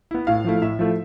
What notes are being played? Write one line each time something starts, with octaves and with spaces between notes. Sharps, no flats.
B3 E4
A2 F5
F3 A3 E4
A2 E5
F3 A3 E4